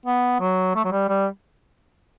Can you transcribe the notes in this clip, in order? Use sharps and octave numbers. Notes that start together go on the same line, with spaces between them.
B3
F#3
A3
F#3
G3
G3